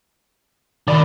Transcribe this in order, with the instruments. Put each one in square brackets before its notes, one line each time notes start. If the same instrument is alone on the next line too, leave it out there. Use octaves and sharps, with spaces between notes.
[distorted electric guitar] D#3 [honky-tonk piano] D5 B5